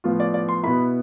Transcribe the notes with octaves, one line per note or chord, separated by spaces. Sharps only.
A2 F3 B3 F4
D5
D5
C6
B2 B3 E4 B5